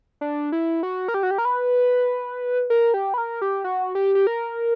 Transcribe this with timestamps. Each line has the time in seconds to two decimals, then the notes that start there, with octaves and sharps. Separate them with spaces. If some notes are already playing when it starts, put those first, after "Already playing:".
0.21 D4
0.52 E4
0.83 F#4
1.08 A#4
1.14 G4
1.23 F#4
1.31 G4
1.38 A#4
1.45 B4
2.70 A#4
2.94 G4
3.14 B4
3.18 A#4
3.42 G4
3.64 F#4
3.95 G4
4.15 G4
4.27 A#4